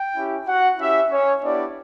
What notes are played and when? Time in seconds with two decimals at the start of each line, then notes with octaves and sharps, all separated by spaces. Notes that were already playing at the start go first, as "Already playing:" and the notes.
Already playing: G5
0.16 C#4 E4 G4
0.47 F#4 F#5
0.78 C#4 E4 G4 E5
1.10 C#4 C#5
1.42 B3 D4 E4 G4 D5